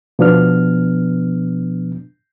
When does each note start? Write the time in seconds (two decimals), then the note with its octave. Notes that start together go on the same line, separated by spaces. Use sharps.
0.19 B2 F3 B3 D4 F6